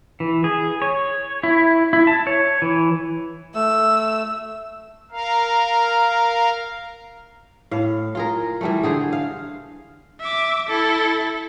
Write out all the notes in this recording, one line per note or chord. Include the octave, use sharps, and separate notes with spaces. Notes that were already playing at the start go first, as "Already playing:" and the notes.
E3
G#4
C#5
E4
E4
A5
C#5
E3
A3 E6
A#4 F5
A2 F5
F4 G#4 A#4
E3 G3 A3
D3 G#4 C5
F5
E5 D6
E4 A4